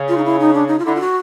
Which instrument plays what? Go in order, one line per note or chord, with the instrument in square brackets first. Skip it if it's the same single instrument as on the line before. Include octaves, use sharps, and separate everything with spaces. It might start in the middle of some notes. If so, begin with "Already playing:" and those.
Already playing: [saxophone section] C#3
[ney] F4
D#4
E4
D#4
D4
D#4
F4
[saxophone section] D3 [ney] E4
[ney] F4
F#4